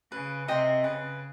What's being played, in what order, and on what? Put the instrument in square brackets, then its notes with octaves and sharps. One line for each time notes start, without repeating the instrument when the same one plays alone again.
[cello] C#3 [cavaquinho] B4
[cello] C3 [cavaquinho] D#5 G5 C6
[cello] C#3 [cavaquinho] B4